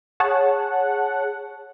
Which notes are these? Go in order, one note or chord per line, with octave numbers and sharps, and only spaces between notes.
G#4 C#5 F#5 A5